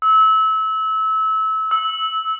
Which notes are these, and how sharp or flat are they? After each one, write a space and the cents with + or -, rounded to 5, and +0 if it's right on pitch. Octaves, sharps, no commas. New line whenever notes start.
E6 -25
E6 -15